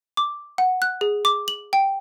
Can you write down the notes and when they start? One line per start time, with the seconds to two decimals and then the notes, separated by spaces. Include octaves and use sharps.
0.17 D6
0.58 F#5
0.82 F#6
1.01 G#4
1.25 D6
1.48 F#7
1.73 G5